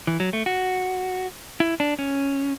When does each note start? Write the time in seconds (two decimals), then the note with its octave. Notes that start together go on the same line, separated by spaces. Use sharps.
0.07 E3
0.20 F#3
0.33 A3
0.46 F#4
1.60 E4
1.80 D4
1.99 C#4